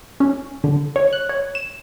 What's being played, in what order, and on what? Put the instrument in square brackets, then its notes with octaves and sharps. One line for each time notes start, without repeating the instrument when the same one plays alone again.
[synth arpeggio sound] C#4
D3
C#5
F#6
C#5
E7